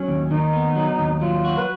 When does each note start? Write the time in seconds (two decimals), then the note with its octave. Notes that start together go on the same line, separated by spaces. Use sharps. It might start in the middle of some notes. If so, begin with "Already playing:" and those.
Already playing: F#3 C#4
0.08 D#2
0.31 D#3 D#4
0.53 B3
0.76 F#3
0.99 D#2
1.21 F#3 F4
1.45 F#4
1.58 B4